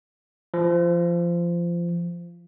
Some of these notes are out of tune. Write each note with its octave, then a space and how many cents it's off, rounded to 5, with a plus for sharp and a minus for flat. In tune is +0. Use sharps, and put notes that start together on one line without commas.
F3 -20